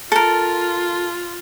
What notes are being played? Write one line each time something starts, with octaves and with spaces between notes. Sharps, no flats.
F4 A4 A#4